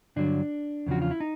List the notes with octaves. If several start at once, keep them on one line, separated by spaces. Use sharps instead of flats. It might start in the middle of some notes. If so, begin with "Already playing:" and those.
G2 D3 F#3 D4
E2 C#3 F3 F#4
F4
E4
D#4